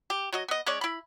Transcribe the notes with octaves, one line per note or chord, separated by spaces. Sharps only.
G4
F#3 F#4 D#5
B3 D#5
G#3 C#4 C#5 D5
E4 B5